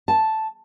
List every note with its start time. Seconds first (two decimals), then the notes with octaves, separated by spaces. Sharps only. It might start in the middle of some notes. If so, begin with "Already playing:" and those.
0.08 A5